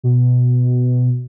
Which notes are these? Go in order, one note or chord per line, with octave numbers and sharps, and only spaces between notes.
B2